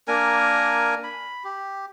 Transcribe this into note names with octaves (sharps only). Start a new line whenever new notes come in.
A#3 D4 A#4 G#5
B5
G4